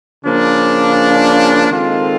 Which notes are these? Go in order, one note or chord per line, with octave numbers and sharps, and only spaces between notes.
C#3 F3 A#3 D4
D#3 G#3 C4 F4 A4